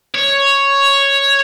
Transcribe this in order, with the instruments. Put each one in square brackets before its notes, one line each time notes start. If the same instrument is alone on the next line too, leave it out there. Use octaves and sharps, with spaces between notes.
[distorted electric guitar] C#5